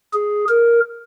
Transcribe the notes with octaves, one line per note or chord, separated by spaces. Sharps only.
G#4
A#4